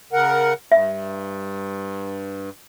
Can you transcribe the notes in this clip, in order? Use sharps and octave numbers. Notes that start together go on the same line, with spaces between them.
C#3 A#4 F#5
G2 E5